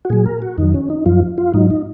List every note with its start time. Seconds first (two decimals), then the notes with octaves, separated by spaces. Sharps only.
0.05 F#4
0.10 A#2 F#3 G#4
0.26 A#4
0.42 F#4
0.58 F2 D#3 F#3 D#4
0.74 C#4
0.90 D#4
1.06 F#2 F3 F4
1.38 F4
1.54 G#2 F#3 D#4
1.71 D#4